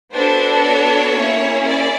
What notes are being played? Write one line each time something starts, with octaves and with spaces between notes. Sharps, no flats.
B3 D4 F#4 A4 C5
C#5
A#3 C#4 E4 G#4
D5